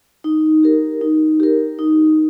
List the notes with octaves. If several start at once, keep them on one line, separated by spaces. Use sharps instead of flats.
D#4
G4 A#4
D#4
G4 A#4
D#4